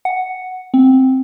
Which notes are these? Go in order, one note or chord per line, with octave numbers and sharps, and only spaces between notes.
F#5
C4